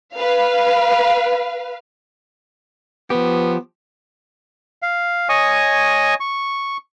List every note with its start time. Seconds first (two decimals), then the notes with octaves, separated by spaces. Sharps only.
0.15 B4 F5
3.10 F3 B3 G4
4.82 F5
5.29 C#5 D#5 G#5 C#6 D#6
6.20 C#6